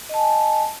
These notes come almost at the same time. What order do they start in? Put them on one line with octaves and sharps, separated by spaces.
D#5 A5 G#5